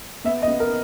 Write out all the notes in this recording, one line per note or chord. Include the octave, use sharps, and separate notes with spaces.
B3 E5
D#5
B3
A#4